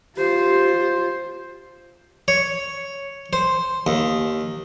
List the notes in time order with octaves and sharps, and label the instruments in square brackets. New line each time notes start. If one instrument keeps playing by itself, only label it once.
[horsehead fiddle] F4 C5 [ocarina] G4
[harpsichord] C#5
C5
D#2